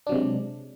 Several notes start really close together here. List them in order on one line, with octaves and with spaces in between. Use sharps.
D4 F#3 C3 G#3